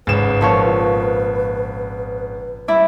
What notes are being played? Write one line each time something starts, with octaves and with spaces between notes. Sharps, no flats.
G#1 C#3 B4 E7
A#2 F3 C#5
G3 E4 D5